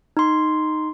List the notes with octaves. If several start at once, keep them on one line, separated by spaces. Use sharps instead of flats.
D#4 C6